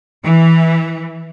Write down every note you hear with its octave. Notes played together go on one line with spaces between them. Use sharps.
E3